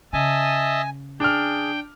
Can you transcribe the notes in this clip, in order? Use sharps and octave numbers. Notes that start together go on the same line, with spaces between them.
C#3 D#5 E5 G#5 A5
D4 G#4 G5 F6